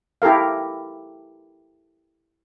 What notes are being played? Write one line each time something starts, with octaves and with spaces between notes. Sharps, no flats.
E4 G4 A4 A#4 F5